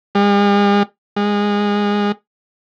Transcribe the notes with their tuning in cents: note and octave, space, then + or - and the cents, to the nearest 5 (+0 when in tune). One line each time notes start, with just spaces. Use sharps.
G#3 -45
G#3 -20